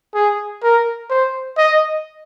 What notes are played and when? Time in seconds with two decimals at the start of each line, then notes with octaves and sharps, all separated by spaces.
0.15 G#4
0.63 A#4
1.10 C5
1.58 D#5